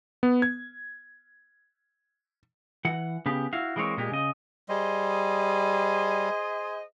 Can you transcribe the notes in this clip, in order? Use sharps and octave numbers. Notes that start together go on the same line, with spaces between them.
B3
G#6
E3 F#5
C#3 B3 G4
E4 F#4 F5
E3 G#3 A#3 C4 C#5
A#2 G#3 G4
C#3 D#5
G3 G#4 C5 D#5